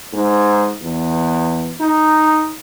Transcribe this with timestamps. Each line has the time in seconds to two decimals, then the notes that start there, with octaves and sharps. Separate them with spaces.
0.13 G#2
0.81 E2
1.81 D#4